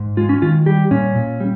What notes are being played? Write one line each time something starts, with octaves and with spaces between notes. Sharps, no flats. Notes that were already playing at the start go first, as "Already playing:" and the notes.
Already playing: G#2
G#3 F4
C#4
D#3 F4
G3 G4
A#2 C#4
A#2
G3